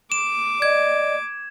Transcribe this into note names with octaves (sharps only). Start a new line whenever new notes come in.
D6 E7
D5 D#5 G#6